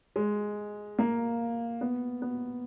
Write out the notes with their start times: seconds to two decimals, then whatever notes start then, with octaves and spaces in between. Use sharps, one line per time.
0.16 G#3
0.99 A#3
1.81 B3
2.22 B3